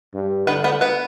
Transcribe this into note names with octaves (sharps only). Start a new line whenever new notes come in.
G2
D3 B3 B4
B3 B4
B3 B4